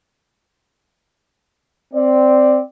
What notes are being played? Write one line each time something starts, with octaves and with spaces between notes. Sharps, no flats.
C4 D5